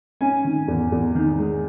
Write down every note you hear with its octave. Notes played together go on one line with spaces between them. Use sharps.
C#4 G#5
D#3
E2
E2
D#3
G#3